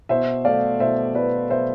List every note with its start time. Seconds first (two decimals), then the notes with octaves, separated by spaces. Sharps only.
0.09 B2 C5 E5
0.45 A3 D5 F5
0.80 B2 C5 E5
1.15 A3 B4 D5
1.50 B2 C5 E5